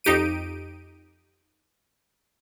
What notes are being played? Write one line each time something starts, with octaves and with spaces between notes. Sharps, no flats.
F2 D#4 G4 D7 D#7